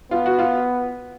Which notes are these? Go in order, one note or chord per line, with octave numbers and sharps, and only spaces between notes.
B3 F4
F#4
F4